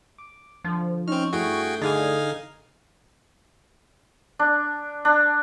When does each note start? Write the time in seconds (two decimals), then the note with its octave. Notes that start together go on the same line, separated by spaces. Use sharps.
0.18 D6
0.64 D3 F3
1.08 C4 C#4 D#4 C#6 F6
1.33 G2 A3 E4 F#4 G#4 G5
1.82 D3 D#4 G#4 F5 G#5
4.39 D4
5.05 D4